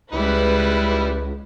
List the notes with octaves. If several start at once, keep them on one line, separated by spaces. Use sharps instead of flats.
C#2 G3 G#3 E4 B4